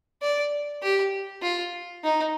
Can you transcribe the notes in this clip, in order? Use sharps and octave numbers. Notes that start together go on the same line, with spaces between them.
D5
G4
F4
D#4